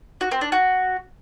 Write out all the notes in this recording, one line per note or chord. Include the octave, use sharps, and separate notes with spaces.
F#4
C4
D4
F#4